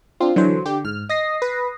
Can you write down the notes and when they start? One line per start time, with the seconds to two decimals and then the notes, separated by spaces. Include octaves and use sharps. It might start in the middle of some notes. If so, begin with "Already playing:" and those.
0.20 C4 D4 F4
0.36 D3 E3 F#3 C5
0.66 D3 G4
0.85 G#2 F6
1.09 D#5 D#6 A#6 C7
1.42 B4